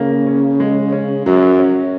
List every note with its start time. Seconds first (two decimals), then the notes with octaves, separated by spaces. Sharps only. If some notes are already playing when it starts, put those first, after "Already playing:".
Already playing: C#3 A#3
0.27 C#4
0.60 G#3
0.92 C#4
1.26 F#2 F#3
1.59 C#4